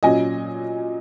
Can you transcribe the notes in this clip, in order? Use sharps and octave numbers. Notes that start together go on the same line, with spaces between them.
A#2 F#3 C#4 D#5 G#5